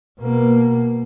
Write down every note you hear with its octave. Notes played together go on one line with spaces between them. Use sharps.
B2 A#3